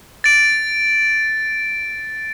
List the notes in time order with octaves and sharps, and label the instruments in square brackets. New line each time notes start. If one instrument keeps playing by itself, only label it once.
[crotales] A6 D7